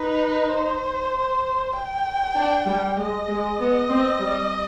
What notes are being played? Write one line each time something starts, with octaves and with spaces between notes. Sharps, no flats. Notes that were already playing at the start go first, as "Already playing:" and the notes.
Already playing: D#4 B4
C5
G5
D4
G3
G#3 D#5
G#3
B3
C4
G3